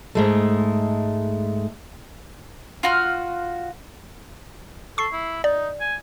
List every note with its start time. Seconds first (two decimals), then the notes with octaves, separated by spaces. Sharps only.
0.15 G#2 G#3 A3
2.83 F4 F#4 F6
4.98 A4 C#6 C7
5.12 E4
5.44 D#4 D5
5.80 G#5